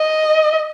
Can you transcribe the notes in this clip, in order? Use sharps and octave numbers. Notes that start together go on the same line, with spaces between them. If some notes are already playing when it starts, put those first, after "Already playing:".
Already playing: D#5